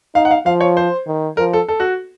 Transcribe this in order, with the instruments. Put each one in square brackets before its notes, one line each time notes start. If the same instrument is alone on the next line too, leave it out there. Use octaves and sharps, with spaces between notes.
[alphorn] D#4 [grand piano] F5
[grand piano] F#5
F5
[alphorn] F3 [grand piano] F5
[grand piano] C#5
C5
[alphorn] D#3
[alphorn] F3 [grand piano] A#4
[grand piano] A4
A4
F#4